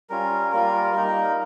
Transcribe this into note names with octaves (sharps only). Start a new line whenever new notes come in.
G3 C#4 F4 A#4
G3 A#3 F4 A#4
G3 A#3 D#4 A#4